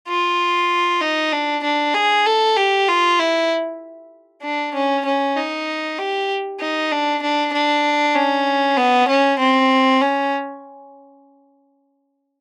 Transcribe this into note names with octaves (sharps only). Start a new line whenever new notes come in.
F4
D#4
D4
D4
G#4
A4
G4
F4
E4
D4
C#4
C#4
D#4
G4
D#4
D4
D4
D4
C#4
B3
C#4
C4
C#4